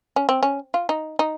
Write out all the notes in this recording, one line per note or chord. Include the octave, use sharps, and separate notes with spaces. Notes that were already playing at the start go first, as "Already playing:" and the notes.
C#4
C4
C#4
F4
D#4
D#4